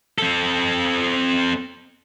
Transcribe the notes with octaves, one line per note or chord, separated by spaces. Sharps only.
C4 A4